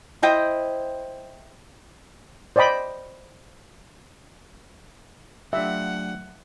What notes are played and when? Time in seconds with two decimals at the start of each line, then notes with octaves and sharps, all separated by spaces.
0.22 E4 C5 D#5 G5
2.56 C5 D5 D#5 G5 B5
5.53 F#3 A3 D4 F4 G4 E5 F#5